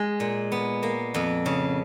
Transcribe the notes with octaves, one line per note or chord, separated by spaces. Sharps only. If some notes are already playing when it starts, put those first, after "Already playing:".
Already playing: G#3
A#2
B3
A#3
F2
C#3